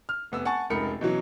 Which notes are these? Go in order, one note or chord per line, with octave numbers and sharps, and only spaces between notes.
F6
F1 B3 E6
F#5 G#5 A5 C#6 A6
F1 C#2 D#4 A#4 B5 C#7
B2 E3 F#3 C#4